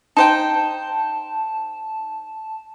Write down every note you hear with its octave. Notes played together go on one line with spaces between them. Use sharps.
D#4 C5 G5 A5